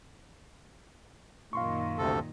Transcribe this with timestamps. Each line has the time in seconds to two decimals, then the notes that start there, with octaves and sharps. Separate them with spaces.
1.53 F#2 A#2 D#3 F5 C6 C#6
1.99 D2 C3 A4